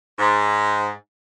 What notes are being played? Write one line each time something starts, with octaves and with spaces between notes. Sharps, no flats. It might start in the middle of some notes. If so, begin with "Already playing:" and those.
G#2